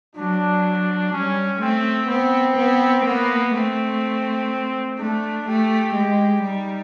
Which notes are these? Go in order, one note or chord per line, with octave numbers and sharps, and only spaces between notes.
F#3 D4
G3 C#4
A3 C4
B3 C4
B3
A#3 B3
A3 C4
A3 D4
A3 G4
G#3
G3 D#4